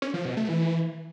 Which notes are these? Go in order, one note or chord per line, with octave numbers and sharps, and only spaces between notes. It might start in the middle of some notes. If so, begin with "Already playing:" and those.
C#4
F3
B2
A3
E3